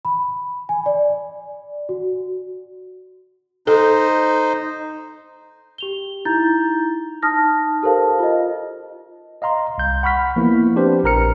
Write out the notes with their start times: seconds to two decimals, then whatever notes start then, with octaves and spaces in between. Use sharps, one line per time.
0.05 B5
0.69 G#5
0.86 D5
1.89 F#4
3.67 D#4 A4 C5
5.78 G4 F7 G7
6.25 D#4 E4 A#5 G6 A6
7.22 D#4 A5 D#6 F6 A#6
7.83 G4 A4 A#4 C5 F5 A5
8.19 F4 D#5
9.42 D#5 F5 A#5 C6
9.78 C2 G6
10.03 F#5 B5 C#6 F6 B6
10.36 F3 A#3 B3 E4
10.76 C4 D4 G4 B4 C5
11.04 A#1 A#4 A#5 F6 C#7